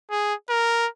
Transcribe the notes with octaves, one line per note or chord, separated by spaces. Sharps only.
G#4
A#4